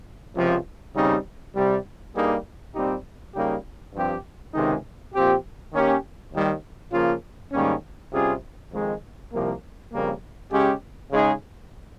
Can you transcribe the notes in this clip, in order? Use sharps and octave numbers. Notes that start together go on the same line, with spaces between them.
C#2 C3 F3
D#2 C#3 G3 C4 D#4
C2 C3 G3
G2 G3 A#3 D#4 G#4
A#2 G3 C4 D#4 G4
C#3 G3 A#3 D#4 G4
G2 F3 C4 G4
C#2 C3 D#3 G#3 D#4
A#2 F3 C4 G4
D#3 A#3 C#4 G4
D#2 D#3 G3
C#3 F3 A#3 F4
G#2 D#3 G3 A#3 C#4
C3 G3 C#4 F4 G#4
F2 D#3 G#3
C2 C3 F3 A#3
F2 C#3 G3 A#3
C#3 G#3 C#4 G4
C#3 G#3 D#4 G#4